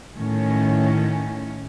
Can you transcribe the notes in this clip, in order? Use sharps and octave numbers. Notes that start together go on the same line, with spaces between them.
A2 D#3 C#4